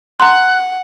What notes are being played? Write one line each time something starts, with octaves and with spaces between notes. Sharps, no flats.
F#5 A#5 C6 F#6